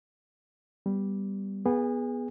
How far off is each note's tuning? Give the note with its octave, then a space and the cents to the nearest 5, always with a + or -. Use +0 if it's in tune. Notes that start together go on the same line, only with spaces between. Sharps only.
G3 +0 B3 +0
B3 -10 G#4 +0 G#5 -35